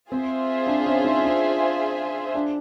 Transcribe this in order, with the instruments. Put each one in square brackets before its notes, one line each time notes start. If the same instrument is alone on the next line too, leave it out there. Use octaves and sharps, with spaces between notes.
[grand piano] C4 [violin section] F4 G#4 C5 E5
[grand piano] D4
C#4
D#4
D4
D4